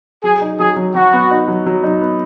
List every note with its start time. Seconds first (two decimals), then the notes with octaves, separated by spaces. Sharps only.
0.23 F#3 G#4
0.41 D#4
0.59 F#3 G#4
0.76 F#3
0.95 F#3 F#4
1.13 B3
1.31 D#4
1.48 F#3
1.66 F#3
1.84 D#4
2.01 B3